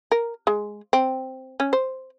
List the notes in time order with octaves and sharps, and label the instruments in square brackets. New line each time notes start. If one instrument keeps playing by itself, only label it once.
[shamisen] A#4
G#3
C4
C#4
C5